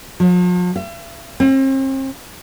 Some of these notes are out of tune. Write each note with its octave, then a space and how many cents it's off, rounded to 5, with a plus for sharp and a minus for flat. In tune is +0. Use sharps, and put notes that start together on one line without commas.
F3 +45
E5 +45
C4 +40